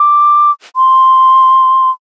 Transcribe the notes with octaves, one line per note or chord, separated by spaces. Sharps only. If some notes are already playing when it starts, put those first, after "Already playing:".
Already playing: D6
C6